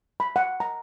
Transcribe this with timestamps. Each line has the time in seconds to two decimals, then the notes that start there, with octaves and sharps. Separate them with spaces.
0.20 B5
0.36 F#5
0.60 A#5